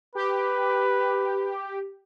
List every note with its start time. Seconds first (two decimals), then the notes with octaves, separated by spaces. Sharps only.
0.15 G4 B4